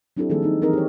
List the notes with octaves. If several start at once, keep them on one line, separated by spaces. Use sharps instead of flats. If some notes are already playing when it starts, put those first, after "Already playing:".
F#3 C4 D4 E4 G4 A4
D#3 F3 G3 A#3 G#4 A4
C4 D#4
E3 C4 D#4 G#4 A#4 D#5
G4 C#5